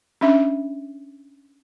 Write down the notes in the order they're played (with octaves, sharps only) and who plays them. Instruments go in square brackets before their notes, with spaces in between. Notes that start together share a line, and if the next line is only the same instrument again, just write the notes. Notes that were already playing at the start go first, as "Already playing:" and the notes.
[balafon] C#4 D4 E5